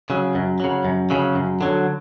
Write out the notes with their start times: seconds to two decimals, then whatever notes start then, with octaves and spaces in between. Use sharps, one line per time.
0.10 C#3 F#3
0.35 F#2
0.60 C#3 F#3
0.85 F#2
1.10 C#3 F#3
1.35 F#2
1.61 D3 F#3